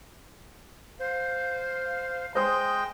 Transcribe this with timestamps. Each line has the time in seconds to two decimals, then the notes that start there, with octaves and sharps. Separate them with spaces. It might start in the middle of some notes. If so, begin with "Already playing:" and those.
0.99 C5 F5
2.35 G#3 C5 D#5 G5 C6 D#6 G6